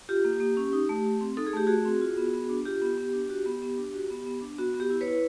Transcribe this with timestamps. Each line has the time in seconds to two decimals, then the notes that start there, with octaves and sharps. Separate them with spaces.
0.09 F4 G4
0.25 A#3
0.40 A#3
0.57 C#4
0.73 D#4
0.89 A3
1.05 A3
1.21 C4
1.37 D#4 A4
1.47 G#4
1.54 A3 G4
1.67 A3 F#4 G#4
1.85 C4
2.01 F4
2.17 B3
2.33 B3
2.49 D4
2.65 F4 G4
2.82 B3
2.98 B3
3.13 D4
3.29 F#4
3.46 B3
3.62 B3
3.78 D4
3.94 F#4
4.10 B3
4.26 B3
4.42 D4
4.58 B3 F#4
4.74 B3
4.80 G4
4.90 E4
5.01 B4 C#5
5.07 E4